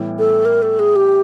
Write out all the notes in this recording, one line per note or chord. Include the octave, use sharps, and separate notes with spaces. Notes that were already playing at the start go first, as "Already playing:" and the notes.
Already playing: A2 E3 G3 B3 E4
A4
A#4
A4
G#4
G4